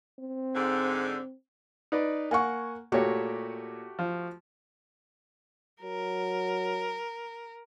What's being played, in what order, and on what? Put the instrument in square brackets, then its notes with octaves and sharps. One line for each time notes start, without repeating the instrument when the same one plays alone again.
[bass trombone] C4
[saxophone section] G#2 D3
[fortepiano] D#4 B4 D5
[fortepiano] A#3 F#5 [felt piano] G#5 C#6
[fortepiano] A#2 C#5 [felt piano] A3 F#4 G4
[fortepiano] F3
[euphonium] F#3 [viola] A#4